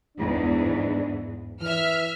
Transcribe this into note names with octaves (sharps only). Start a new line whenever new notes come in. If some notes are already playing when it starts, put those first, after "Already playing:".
G1 E2 G#2 D4
E3 E5 F6